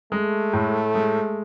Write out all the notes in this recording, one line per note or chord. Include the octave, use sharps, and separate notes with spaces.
G#3 A3
A2
G#3